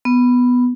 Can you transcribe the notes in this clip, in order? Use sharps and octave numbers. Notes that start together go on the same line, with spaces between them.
B3